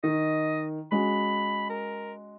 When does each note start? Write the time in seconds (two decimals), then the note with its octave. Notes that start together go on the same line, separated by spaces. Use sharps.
0.04 D#3 D#5
0.92 G#3 C#4 F#4 B5
1.70 A#4